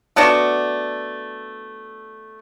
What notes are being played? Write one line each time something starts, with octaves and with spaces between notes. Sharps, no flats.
A3 B3 D4 F#4